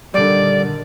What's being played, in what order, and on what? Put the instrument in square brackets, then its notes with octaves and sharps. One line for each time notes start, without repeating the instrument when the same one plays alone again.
[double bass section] A#2 D3 D#3 [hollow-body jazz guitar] G3 [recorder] D5